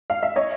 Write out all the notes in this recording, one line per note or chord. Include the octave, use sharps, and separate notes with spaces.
F5
E5
C#5 D#5